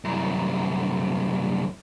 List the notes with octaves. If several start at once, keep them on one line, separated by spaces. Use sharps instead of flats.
C2 F#2